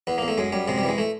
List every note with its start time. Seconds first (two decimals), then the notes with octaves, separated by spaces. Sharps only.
0.07 E2 B3
0.18 E2 A#3
0.28 A3
0.38 F#2 G#3
0.52 F#2 G3
0.68 C3 G#3
0.78 G3
0.83 E3 G#3
0.98 A3